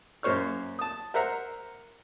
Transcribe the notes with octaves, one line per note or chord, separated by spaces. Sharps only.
F#2 A#3 C5 C#5 F6
A5 D#6
A#4 C5 E5 F#5 A#5